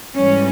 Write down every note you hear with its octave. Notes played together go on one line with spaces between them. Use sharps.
G#2 E3 G3 C#4